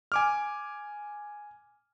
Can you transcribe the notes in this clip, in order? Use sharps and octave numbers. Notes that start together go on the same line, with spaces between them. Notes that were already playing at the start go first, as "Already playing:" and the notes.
G#5 D6 F6